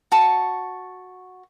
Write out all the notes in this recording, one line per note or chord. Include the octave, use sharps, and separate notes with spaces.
F#4 A5 C#6